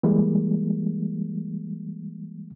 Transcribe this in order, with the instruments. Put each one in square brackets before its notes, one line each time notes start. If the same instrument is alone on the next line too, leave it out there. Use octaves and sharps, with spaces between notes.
[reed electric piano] E3 G3 G#3 A#3